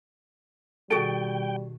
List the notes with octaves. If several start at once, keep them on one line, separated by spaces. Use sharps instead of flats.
B2 D#3 G3 F#4 G#4 A4 G5